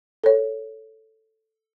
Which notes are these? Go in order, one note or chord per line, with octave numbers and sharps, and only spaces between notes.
A4 C#5